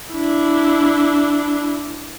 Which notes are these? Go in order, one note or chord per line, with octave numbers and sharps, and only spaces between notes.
D4 E4